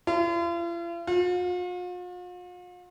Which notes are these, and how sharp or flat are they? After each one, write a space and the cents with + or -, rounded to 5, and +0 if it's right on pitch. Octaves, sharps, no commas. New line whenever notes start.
F4 -45
F4 +45